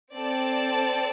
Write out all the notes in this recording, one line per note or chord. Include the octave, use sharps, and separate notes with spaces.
C4 A4 D5 A5